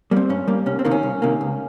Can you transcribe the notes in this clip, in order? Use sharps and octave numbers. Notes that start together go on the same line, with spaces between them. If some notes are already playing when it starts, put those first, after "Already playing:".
G3 A#3
C4
G2 C#4
G3 A#3
C2 C#4
C4
C3 D#3 A#3
C#4
C2
C3 D#3 A#3
C#2